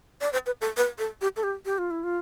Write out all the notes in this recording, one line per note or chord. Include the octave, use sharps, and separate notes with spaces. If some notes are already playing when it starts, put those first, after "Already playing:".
D5
C5
B4
A4
B4
A4
G4
A4
G4
G4
F4
E4
F4